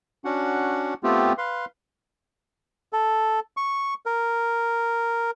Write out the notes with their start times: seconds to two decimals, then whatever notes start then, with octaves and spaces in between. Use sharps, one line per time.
0.25 C#4 D4 F#4 F#5
1.03 A3 B3 C4 F4 G4
1.38 B4 F5 C6
2.93 A4
3.57 C#6
4.06 A#4